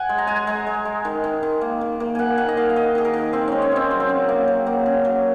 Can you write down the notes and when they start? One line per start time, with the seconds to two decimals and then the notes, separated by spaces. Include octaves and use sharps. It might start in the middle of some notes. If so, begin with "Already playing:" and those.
Already playing: F#5 G#5
0.09 G#3
0.18 A#5
0.27 G#3 G#5
0.36 A#5
0.47 G#3 G#5
0.67 G#3
0.85 G#3
1.05 D#3
1.24 D#3
1.43 D#3
1.61 A#3
1.81 D#3
2.00 A#3
2.15 A#3 F#5 G#5
2.37 D#3 F#5
2.48 D#5
2.57 D#3 F5
2.70 F5
2.76 D#3 D#5
2.95 D#3 G#4
3.05 A#4
3.14 D#3
3.33 D#3 C4
3.48 G#3 C#4
3.62 C#4
3.72 G#3 C4
3.91 F#3
4.00 C4
4.09 C#3
4.28 A#3
4.48 F#3
4.66 A#3
4.86 C#3
5.05 F#3